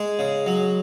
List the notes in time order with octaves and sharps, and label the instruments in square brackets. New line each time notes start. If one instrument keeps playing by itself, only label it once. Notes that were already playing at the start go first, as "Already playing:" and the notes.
Already playing: [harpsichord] G#3 G#4
C#3
F#3